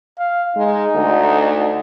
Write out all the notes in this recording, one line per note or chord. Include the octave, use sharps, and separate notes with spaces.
F5
G#3 D#4
D2